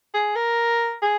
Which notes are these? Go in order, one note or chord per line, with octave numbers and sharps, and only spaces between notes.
G#4
A#4
G#4